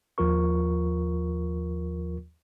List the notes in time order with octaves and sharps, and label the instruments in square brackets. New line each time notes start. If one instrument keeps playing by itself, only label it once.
[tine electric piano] D#2 F3 F4 A#4 C#6